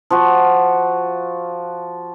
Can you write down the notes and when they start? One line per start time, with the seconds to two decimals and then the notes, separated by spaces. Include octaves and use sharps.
0.10 F3 F#4